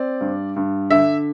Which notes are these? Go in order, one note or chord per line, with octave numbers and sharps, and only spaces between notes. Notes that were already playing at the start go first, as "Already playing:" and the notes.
Already playing: C4 D5
G2
G2
D3 E5